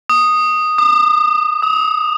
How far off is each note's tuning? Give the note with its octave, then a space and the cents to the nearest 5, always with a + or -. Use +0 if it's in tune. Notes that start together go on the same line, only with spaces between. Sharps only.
D#6 -5
D#6 -45
D#6 +40